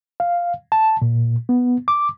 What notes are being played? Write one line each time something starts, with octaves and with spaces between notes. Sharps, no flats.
F5
A5
A#2
B3
D6